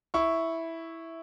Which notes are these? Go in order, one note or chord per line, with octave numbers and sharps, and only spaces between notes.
E4 C#6